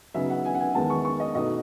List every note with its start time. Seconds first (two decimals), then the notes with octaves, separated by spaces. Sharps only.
0.14 C#3 F#3 B3 D#4 E5
0.30 F#5
0.45 G#5
0.54 F#5
0.60 G#5
0.75 E2 D#3 G#3 B3 A5
0.90 C#6
1.05 C#6
1.20 D#5
1.35 B2 A3 D#4 D#5